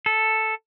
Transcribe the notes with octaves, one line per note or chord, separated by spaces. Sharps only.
A4